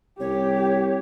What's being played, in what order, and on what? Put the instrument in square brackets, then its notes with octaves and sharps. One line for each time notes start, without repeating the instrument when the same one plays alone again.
[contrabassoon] C2 [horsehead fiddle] G4 [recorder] C#5